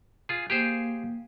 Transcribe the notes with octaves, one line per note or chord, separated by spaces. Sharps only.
F4 G#4
A#3 G4 G#4 C5